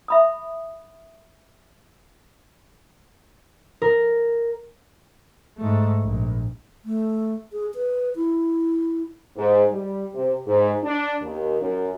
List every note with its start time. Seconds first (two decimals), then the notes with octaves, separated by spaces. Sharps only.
0.08 E5 B5 D#6
3.82 A#4
5.58 G#2 A3
6.01 A#1
6.85 A3
7.53 G#4
7.75 B4
8.16 E4
9.36 G#2
9.72 G3
10.14 C3
10.47 G#2
10.84 D4
11.22 D#2
11.61 F#2